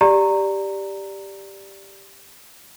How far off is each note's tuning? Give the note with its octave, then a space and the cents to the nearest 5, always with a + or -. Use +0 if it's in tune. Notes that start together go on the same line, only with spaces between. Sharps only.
G4 +0 D5 +0 A#5 -10